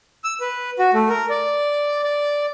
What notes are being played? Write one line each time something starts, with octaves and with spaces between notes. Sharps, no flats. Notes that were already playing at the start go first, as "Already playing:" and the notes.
E6
B4
F#4
A3
A#4
D5
D5